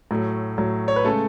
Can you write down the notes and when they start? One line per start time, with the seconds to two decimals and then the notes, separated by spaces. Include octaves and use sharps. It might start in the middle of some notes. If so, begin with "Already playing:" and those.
0.11 A2 F#3 A3
0.58 A2 F#3 A3
0.88 C#5
0.96 B4
1.05 C#3 G#3 A3 A4